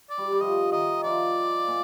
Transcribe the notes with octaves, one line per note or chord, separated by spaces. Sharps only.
D5
G3
G3
F3 D#5
D#3 D#5
F3 D5
A#2